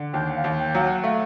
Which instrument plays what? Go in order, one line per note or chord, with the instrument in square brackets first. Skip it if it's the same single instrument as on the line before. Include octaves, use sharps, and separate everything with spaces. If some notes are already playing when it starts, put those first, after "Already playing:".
Already playing: [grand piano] D3
[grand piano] D#2 [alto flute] G5
[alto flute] F5
[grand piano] D#2
[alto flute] G5
[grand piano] F#3 [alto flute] F5
[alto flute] F#5
[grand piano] A3 [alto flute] F5